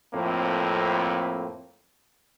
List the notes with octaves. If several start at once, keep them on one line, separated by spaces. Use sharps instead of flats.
F2 A2 A#3 C4